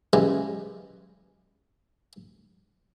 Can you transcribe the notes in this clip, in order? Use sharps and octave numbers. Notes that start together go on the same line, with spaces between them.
F#2 E3 G3 G#3